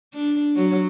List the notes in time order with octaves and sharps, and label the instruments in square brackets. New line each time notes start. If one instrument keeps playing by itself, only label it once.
[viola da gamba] D4
F#3